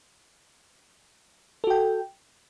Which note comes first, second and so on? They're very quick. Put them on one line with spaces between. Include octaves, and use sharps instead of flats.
A4 F#4 G5